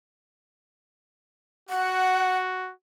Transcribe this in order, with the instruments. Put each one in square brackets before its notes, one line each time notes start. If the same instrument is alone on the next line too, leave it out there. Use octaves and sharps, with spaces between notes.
[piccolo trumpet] F#4 [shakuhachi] F#5